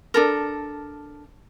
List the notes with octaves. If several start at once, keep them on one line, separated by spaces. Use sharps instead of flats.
D4 A4 A#4